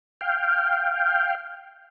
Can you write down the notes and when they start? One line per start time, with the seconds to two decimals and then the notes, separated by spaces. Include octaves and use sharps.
0.21 F5 G5